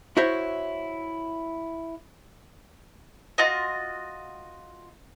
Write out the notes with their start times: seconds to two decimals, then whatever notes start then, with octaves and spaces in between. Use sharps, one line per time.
0.17 E4 F#4 C5 C#5 E5
3.38 F4 F#4 D#5